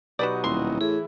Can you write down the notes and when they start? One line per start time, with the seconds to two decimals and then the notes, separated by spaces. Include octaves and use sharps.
0.19 B2 F#3 D#4 F#4 G4 B4 D5
0.44 D#1 E4 C6
0.81 A2 E3 G#4